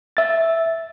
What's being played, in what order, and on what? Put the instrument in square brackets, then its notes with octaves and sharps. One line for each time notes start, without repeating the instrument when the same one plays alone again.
[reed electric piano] E5 A6